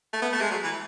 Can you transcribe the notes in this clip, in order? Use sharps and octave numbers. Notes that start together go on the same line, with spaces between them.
A3
B3
A3
G#3
F#3
E3